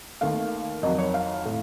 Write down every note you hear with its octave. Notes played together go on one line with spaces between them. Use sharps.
D#2 D#3 A3 F5
F2 D#3 F#3 D#5
C#5
F5
A2 A3